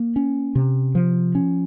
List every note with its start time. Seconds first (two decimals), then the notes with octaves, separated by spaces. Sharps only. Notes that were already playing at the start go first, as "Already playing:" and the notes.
Already playing: A#3
0.16 C#4
0.55 C3
0.95 F3
1.35 C#4